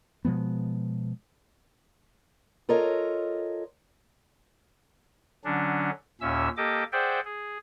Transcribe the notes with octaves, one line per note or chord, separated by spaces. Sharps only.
B2 F3 G#3 B3
F4 A4 A#4 C#5 D#5
D3 F#3 C#4 D4
D#2 A#2 C#4 E5 E6
A#3 G4 A4 D#5 D6
G#4 C5 D5 E5 F#5 G5
G#4